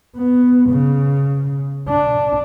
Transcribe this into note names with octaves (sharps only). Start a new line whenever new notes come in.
B3
C#3
D4